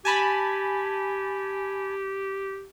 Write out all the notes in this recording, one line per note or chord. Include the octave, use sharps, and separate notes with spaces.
G4 G#5 A5 B5